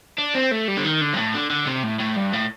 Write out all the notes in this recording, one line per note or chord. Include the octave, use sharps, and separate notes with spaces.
D4
C4
A3
G3
D3
D#3
D3
G2
A2
D3
D3
C3
A2
A2
G2
A2